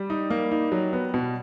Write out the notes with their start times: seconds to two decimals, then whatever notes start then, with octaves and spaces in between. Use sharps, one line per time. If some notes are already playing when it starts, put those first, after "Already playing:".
Already playing: G3
0.10 D#4
0.30 A#3
0.52 D#4
0.72 F#3
0.93 B3
1.14 B2